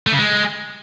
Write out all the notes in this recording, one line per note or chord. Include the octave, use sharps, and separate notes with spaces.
A3
C#3
G#3